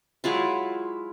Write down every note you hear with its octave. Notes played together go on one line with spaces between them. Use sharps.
F#3 G#3 E4 F4